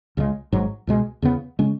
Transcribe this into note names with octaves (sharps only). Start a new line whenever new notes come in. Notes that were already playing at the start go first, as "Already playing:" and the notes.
C#2 C#3 G#3
G#1 G#2 F#3
C#2 B2 G#3
E2 C#3 G#3 B3
C#3 G#3 C#4